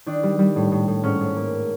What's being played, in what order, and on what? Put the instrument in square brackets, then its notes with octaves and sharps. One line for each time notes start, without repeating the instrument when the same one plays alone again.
[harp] D#3 D4
G3
G3
A2
A2
A2
G#2 C#4
G#2
A#3